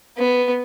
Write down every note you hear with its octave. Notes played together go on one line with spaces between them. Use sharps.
B3